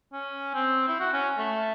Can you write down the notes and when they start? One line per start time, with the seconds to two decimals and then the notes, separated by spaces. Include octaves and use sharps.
0.13 C#4
0.54 C4
0.88 E4
1.00 F#4
1.13 C#4
1.38 A3